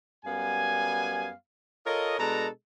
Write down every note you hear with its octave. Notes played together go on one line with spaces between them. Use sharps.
F#2 G3 B3 F5 G#5
F4 A4 A#4 C#5 D#5
B2 G#3 D4 A4 A#5